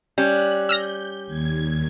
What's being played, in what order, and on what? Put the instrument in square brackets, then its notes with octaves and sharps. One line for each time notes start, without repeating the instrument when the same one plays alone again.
[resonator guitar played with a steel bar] G3 C#4 [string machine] F#6
[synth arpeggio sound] E6 F6 A#6 [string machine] G6
[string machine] D#2 G#6